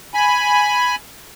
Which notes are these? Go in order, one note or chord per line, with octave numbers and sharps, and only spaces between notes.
G#5 B5